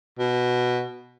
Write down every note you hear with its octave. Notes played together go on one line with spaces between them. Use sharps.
B2